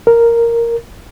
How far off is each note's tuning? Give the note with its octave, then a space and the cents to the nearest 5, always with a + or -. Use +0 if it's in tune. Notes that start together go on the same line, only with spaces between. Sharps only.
A#4 +0